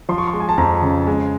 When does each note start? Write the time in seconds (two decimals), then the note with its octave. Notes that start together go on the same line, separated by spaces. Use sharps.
0.09 F3 C6
0.18 C#6
0.28 C6
0.33 G#3
0.40 G#5
0.49 A5
0.58 F2 A#5
0.82 C#3
1.07 G#3